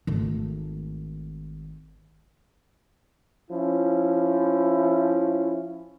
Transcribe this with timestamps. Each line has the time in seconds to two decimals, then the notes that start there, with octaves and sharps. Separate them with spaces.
0.07 G#1 A3
3.51 F3 C#4 E4